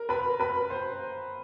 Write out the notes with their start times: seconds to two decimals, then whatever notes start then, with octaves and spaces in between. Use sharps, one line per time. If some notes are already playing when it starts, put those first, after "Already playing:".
Already playing: A#4 A#5
0.09 B4 B5
0.40 B4 B5
0.70 C5 C6